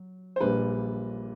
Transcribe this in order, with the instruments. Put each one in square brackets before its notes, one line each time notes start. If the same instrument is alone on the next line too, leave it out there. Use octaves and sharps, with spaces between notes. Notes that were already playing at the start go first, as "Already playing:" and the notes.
Already playing: [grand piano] F#3
C5
A#1 A#2 G3 B4